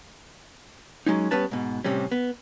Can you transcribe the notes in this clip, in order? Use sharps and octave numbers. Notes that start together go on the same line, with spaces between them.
F#3 G#3 C#4 D#4
G3 B3 C#4 B4 A5
G#2 B2
A2 C3 G3 C4 C#4
B3